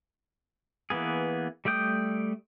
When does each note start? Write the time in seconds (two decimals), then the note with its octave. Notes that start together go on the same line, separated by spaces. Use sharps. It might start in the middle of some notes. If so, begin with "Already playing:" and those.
0.90 E3 A#3 B3 G#4
1.65 G3 A3 D5 G5 D#6